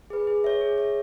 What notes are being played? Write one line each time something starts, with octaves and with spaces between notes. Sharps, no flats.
G#4 B4
G#4
C#5 E5
G#4
C#5 E5